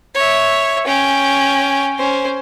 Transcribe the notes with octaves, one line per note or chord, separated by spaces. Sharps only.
C#5 E5
C#4 G5
C#4 C5